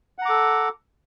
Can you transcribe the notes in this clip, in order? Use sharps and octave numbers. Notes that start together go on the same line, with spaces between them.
A4 F#5 A#5 D6